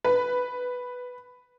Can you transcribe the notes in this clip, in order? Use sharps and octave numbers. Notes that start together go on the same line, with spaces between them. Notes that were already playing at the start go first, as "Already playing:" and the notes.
B4